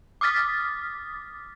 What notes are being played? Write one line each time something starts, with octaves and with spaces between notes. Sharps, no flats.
D6 D#6 F6 A6 B6